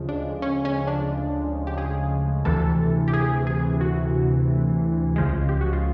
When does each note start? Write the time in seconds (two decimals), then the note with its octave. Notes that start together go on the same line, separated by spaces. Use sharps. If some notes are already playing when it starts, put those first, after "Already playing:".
Already playing: D2 C#3 F3 G#3
0.09 D4
0.42 C#4
0.65 C#4
0.87 D4
1.67 G4
1.78 G#4
2.45 D2 C3 E3 A4
3.08 G4
3.13 G#4
3.47 G#4
3.81 F#4
5.16 C#2 C#3 F3 G#3
5.49 G4
5.61 F#4
5.73 F4